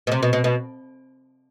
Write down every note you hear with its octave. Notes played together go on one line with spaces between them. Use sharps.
B2
C3
B2
B2
B2